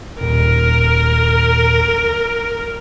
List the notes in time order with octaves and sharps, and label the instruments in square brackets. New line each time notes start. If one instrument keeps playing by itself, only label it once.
[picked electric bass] D#1 [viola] A#4